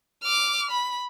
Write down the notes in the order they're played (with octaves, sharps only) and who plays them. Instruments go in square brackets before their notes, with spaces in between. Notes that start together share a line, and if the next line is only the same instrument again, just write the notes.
[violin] D6 F6
B5